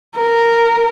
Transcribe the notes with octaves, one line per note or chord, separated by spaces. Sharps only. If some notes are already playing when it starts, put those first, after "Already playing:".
A#4